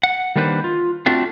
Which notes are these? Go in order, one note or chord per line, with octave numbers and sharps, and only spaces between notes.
F#5
D#3 G3 A#3 D4 B4 C5
F4
A3 C4 D4 F4 F#4